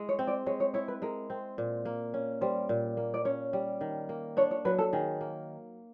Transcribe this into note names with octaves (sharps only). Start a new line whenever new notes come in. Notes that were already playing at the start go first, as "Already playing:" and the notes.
Already playing: G#3 E4
C#5
C4
D5
G#3 C#5
C#5
E4 C#5
B4
G#3 A#4
C4
A#2
A#3
C#4
G3 C5
A#2
A#3
D5
C#4 C#5
G3
D#3
A#3
D4 C#5
C#5
F#3 B4
A4
D#3 G#4
A#3